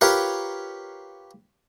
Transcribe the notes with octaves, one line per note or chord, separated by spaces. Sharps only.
F4 G4 A#4 B4 C#5 F5